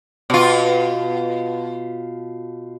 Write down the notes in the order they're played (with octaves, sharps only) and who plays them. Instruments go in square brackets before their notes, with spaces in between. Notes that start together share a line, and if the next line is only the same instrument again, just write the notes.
[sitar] B2 F4